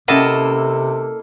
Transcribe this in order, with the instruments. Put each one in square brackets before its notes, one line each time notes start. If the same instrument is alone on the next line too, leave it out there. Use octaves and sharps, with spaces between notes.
[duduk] C3 [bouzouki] A#3 A4 [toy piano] C#4 F#5 [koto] E4 D#5 A5